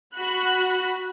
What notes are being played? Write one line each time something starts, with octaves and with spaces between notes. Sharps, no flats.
F#4 B5 F#6